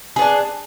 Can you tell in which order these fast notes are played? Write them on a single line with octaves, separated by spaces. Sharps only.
G#4 B3 D4